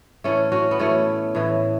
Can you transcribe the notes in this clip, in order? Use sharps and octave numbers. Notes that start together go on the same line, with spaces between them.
A2 E3 A3 C#4
C#4 F#4
B3
A2 E3 A3 C#4
A2 E3